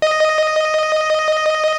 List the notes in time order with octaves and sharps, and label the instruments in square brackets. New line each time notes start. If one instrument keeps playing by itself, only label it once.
[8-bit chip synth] D#5